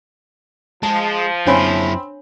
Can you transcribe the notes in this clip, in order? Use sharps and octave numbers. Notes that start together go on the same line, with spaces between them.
F3 G#3 A5
F#2 C4 D4 E4 C#5 G#5 B5 C6